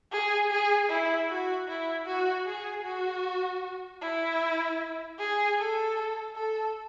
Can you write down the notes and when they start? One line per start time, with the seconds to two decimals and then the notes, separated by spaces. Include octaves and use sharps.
0.11 G#4
0.50 G#4
0.89 E4
1.29 F#4
1.68 E4
2.06 F#4
2.46 G#4
2.85 F#4
4.01 E4
5.19 G#4
5.58 A4
6.35 A4